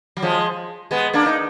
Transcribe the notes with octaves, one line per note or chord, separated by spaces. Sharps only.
F#3
F3 G#3
G#3 B3
A#3 D4
D#4